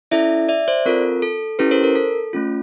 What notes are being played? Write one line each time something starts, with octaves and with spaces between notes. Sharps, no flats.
C#4 E4 A4 D5 E5
D5 E5
C5 D5
C4 F4 A4 A#4
A4
C#4 E4 G4 A4 B4
A#4 C5
A#4
A4
A3 C#4 F4